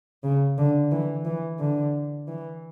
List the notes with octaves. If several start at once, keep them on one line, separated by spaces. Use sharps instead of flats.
C#3
D3
E3
E3
D3
E3